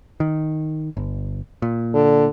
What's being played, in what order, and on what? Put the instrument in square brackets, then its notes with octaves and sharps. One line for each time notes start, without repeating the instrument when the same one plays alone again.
[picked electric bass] D#3
G1
A#2
[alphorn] D3